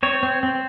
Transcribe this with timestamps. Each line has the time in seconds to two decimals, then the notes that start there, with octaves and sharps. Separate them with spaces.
0.03 C4 C#5
0.23 C4
0.43 C4